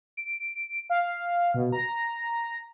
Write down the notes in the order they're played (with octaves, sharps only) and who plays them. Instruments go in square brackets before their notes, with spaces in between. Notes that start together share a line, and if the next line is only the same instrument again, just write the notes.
[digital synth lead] D7
F5
B2
A#5